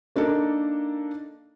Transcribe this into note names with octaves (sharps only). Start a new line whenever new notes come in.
A#3 D4 D#4 A4 A#4